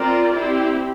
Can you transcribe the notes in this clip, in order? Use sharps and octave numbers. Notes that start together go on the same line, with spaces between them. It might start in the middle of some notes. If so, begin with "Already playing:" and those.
Already playing: C4 F4 A#4 D5
C4 E4 G4